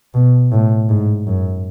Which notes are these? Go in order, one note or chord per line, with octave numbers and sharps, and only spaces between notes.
B2
A2
G#2
F#2